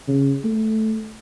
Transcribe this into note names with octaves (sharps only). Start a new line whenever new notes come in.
C#3
A3